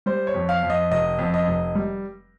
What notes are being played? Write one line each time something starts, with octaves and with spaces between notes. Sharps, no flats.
G3 C5
C#5
F2
F5
F2
D#5
F1 D#5
F2
D#5
F1
G3